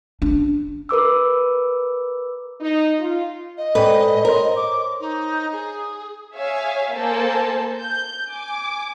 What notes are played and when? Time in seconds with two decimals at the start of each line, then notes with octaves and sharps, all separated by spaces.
0.22 D4
0.89 A#4 B4 D6 E6
2.60 D#4
2.99 F4
3.58 D#5
3.75 G#2 A4 B4 D5 G5
4.25 A#4 C5 C#5 C6
4.56 D6
5.00 D#4
5.52 G#4
6.35 G#4 C#5 E5 F5 G#5
6.94 A#3 A4 C5 G#5 A5
7.78 G6
8.28 G#5 D6